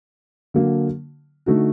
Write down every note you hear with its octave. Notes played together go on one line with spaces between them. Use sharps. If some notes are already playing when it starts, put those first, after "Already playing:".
D3 F#3 A#3
D3 A3 D#4 F#4